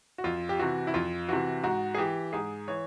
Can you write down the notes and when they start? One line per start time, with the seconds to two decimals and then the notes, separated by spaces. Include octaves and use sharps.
0.18 F#4
0.24 F2 F4
0.49 G4
0.59 C3 E3 F#4
0.87 E4
0.94 F2 F4
1.29 C3 E3 F#4
1.64 G#2 F#4
1.95 G#4
1.98 E3 G4
2.33 G#2 G#4
2.68 E3 C#5